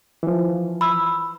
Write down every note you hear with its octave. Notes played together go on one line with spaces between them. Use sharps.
E3 F3
B5 E6